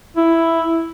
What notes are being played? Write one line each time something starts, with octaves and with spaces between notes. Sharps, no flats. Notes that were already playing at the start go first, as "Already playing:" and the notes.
E4